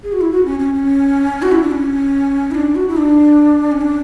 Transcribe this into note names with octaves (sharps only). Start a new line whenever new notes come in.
G#4
F#4
E4
F#4
C#4
C#4
C#4
F#4
E4
D4
C#4
E4
D4
F#4
E4
D4
C#4
D4